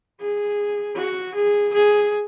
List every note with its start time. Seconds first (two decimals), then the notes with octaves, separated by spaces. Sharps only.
0.21 G#4
0.96 F#4
1.35 G#4
1.74 G#4